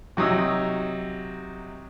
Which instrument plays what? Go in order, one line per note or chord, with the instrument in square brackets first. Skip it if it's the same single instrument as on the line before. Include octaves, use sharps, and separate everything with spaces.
[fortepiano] C3 F#3 D#4 D#6 E6